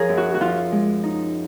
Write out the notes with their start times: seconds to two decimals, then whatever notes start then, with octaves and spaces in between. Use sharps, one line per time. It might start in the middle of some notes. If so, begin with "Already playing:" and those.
Already playing: F3 G#4 A#4 C#5
0.09 F#2
0.17 F#4
0.34 F#4
0.40 F3 F4
0.72 G#3
1.03 D#4